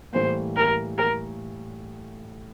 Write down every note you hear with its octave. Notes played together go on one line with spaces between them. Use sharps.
A2 E3 G3 A#3 C5
A#4
A#4